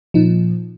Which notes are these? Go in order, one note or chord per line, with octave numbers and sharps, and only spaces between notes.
A#2 F3 D#4